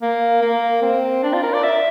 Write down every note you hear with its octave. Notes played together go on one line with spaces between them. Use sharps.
A#3
A#3
C4
D4
F4
A#4
D5
E5